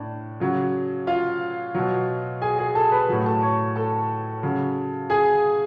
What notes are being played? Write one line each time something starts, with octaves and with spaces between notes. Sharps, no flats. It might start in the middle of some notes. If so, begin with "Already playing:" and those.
Already playing: A2 D4
C#3 F#3
F4 F5
B2 F#3
G#4 G#5
G#4 G#5
A4 A5
B4 B5
A2 F#3
A4 A5
C#5 C#6
A4 A5
C#3 F#3
G#4 G#5